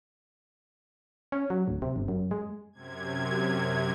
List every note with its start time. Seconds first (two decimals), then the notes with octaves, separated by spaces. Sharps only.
1.32 C#4
1.50 F#3
1.68 D1
1.82 C3
1.96 G1
2.08 F#2
2.31 G#3
2.73 F#2 C3 G#6